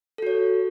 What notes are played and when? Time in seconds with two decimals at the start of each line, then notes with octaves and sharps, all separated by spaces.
0.18 A4
0.22 F#4
0.27 C#5